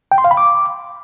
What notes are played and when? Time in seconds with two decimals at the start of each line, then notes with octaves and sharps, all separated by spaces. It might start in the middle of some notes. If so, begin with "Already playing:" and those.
0.12 G5
0.18 C6
0.24 F5
0.31 B5
0.37 D6